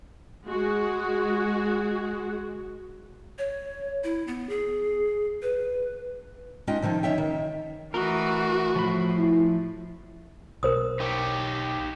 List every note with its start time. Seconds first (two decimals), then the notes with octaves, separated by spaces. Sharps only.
0.47 G#3 F#4
3.38 C#5
4.04 E4
4.27 B3
4.49 G#4
5.42 B4
6.67 G#3 C#4 D#4 F4 D#5 G5
6.82 C3 D#3 F3 D#4
7.03 D#3 C#4 C#5 E5 G5
7.18 D#3
7.94 E3 A3 F#4 A#4 D#5
8.76 A2 F3 B5
9.18 E4
10.63 B1 A#4 C5 D#6
11.00 D#4 G4 C#5